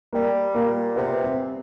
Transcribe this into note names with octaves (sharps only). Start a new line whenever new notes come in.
G3 A#3
A#2 A#3
C3 B3
C4